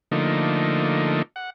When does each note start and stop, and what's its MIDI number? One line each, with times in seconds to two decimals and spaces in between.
0.12 1.22 50
0.12 1.22 53
0.12 1.22 57
0.12 1.22 58
0.12 1.22 63
1.36 1.50 78